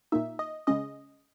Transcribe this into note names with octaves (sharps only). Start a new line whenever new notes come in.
A#2 A#3 D#4 E5
D#5
C#3 G#3 C#4 D#5